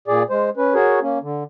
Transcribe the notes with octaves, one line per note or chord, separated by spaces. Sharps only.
A#2 G#4 D5
G#3 C5
C#4 B4
F#4 G#4 A#4 C#5
A#3 C#4
D3